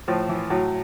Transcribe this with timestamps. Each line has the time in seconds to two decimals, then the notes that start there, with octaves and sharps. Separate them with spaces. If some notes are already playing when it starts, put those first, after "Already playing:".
0.08 A2 F3
0.29 E3
0.50 A2 F#3